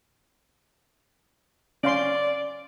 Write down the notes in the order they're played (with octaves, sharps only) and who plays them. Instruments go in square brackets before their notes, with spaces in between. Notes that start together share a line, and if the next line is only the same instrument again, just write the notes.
[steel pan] C#4 F5 C6 [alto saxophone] D5